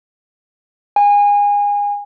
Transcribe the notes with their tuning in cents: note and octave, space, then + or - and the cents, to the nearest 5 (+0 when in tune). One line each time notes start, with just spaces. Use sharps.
G#5 -25